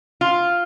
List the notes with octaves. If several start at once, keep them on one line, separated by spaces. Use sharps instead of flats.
F4